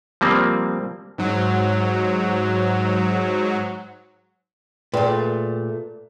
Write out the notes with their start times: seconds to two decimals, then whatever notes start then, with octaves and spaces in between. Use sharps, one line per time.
0.21 F3 G3 A#3 C4
1.18 G#2 F#3
4.94 A#2 A3 G#4 B4 G5